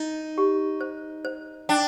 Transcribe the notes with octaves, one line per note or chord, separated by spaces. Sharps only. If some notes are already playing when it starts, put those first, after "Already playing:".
Already playing: D#4 D#5
G4
C5
C5
D4 G5